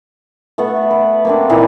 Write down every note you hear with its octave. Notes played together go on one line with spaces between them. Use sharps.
A3 B3 A4 F#5
B4
A#3 C4 D4
A#2 E3 D#4 E4